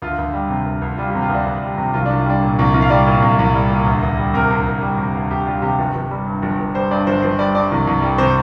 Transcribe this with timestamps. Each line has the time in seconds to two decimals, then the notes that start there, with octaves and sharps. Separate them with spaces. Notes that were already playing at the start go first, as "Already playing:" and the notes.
0.02 D2 F4
0.18 D2
0.33 G3
0.50 C3
0.66 D2
0.82 D2
0.98 G3 F4
1.10 C3 G4
1.22 F4
1.29 D2 D4
1.47 D2
1.62 G3
1.78 C3
1.94 C2 F4
2.05 C2 D4
2.19 F4
2.26 G3 D4
2.42 A#2
2.59 C2
2.74 C2
2.82 F5
2.90 G3 D5
3.06 A#2
3.22 C2
3.39 C2
3.55 G3
3.70 A#2
3.86 D2
4.03 D2
4.19 G3
4.34 C3 A#4
4.50 D2
4.66 D2
4.82 G3
4.98 C3
5.15 D2
5.30 D2 G4
5.47 G3 F4
5.62 C3 G4
5.78 G1
5.95 G1
6.11 G3
6.26 G2
6.42 G1
6.58 G1
6.74 G3 C5
6.91 G2 D5
7.07 G1 C5
7.22 G1 C5
7.39 G3 D5
7.55 G2 D5
7.71 C2
7.87 C2
8.02 G3
8.18 C3 C5